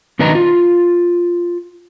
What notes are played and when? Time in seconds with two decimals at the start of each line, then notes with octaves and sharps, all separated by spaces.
0.19 B2 D#3 D4 B4 D#5 A#5
0.35 F4